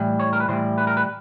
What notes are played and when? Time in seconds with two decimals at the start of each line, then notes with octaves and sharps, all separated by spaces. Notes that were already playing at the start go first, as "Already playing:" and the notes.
Already playing: A2 E3 G3
0.20 C#5
0.33 A#4
0.40 B4
0.48 A2 E3 G3 C5
0.78 B4
0.87 A#4
0.97 B4